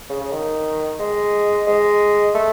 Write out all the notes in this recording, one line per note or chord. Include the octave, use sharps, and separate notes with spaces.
C#3
C#3
D#3
G#3
G#3
A3